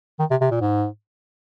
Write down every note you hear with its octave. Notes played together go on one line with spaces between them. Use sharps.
D#3
C3
C3
A#2
G#2